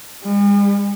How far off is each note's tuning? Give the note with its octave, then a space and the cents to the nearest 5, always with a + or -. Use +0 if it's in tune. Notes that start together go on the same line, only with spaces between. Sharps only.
G#3 -45